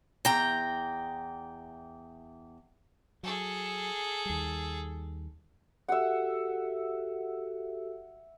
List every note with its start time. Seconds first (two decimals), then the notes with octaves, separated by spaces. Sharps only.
0.25 E2 G5 A#5
3.23 F#3 G#4 A4
4.25 D#2 G3
5.89 F#4 G4 A4 E5 F#5